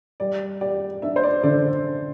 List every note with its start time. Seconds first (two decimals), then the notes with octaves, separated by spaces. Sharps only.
0.20 G3 D5
0.61 G4 D5
1.02 D4 E5
1.16 C5
1.23 D5
1.43 D3 D5